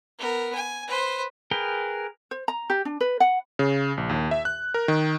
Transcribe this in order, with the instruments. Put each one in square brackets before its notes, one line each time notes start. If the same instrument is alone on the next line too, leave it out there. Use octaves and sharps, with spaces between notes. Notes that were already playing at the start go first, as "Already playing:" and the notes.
[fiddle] B3 A#4
G#5
B4 C5
[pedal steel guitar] G#4 A#4 B4 G5
[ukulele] C5
A#5
G4
D4
B4
F#5
[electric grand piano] C#3
A#1
D#2
E5
F#6
A#4
D#3